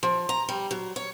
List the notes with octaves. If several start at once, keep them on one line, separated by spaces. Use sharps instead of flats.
F3
A#5
G3
F#3
C#5